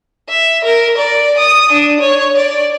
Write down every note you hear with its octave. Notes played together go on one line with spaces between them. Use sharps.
E5
A#4
D5
D#6
D4
C#5
D5